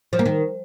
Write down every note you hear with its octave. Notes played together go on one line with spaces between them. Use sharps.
F3
A#3
D#3